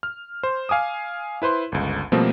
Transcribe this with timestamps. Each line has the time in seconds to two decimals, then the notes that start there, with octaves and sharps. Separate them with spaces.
0.03 F6
0.43 C5
0.69 F5 G#5 D6 D#6
1.42 E4 B4 C5 C6
1.72 G1 C#2
2.12 B2 F3 G3 A3 A#3 C4